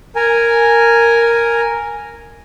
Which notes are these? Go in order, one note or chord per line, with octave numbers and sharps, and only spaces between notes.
A#4 G#5